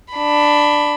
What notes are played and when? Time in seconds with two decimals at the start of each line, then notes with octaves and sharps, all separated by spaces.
0.14 D4 B5